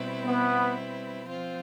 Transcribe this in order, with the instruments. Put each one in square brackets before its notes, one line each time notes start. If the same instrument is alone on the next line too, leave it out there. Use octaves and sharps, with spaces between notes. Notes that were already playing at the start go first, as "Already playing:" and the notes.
Already playing: [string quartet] B2 G3 C4 E4 B4
[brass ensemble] B3
[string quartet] F3 C4 F4 C5